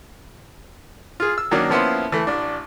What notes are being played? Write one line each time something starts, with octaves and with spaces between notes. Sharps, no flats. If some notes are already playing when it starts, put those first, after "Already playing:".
F4 G#4
E6
D#3 F#3 A#3 C#4 D4
F3 A#3 B3 C#4 E4 C5
E3 A3
A1 D4